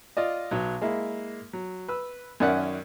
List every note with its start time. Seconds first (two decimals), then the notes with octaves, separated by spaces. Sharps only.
0.17 F4 D5 D#5
0.51 B1 F#3
0.82 G#3 A#3 E4
1.53 F#3
1.88 B4 E6
2.40 F#2 D#3 C#4 D5 E5 F#5